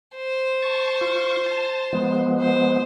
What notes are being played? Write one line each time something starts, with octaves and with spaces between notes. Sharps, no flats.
C5
A5 C#6
F4 C#6
A5
F3 G#3 B3
C5